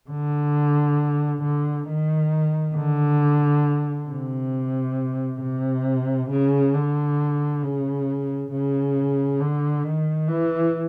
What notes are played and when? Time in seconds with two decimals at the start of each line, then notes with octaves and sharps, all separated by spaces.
0.10 D3
1.42 D3
1.87 D#3
2.74 D3
4.08 C3
5.41 C3
6.30 C#3
6.73 D3
7.62 C#3
8.51 C#3
9.40 D3
9.84 D#3
10.28 E3